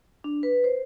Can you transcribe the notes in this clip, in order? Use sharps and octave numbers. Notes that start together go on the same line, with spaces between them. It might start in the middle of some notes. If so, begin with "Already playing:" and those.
D4
B4
C5